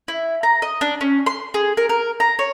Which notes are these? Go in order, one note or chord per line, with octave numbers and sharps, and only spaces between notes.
E4
A#5
D#5
D4
C#4
C6
G#4
A#4
A#4
A#5
C#5